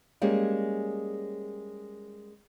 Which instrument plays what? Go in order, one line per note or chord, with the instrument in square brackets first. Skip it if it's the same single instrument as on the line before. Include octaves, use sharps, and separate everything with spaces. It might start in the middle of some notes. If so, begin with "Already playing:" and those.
[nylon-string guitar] G3 G#3 A#3 C#4 G#4